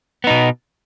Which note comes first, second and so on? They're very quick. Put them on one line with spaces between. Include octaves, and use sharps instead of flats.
B3 D#4 B2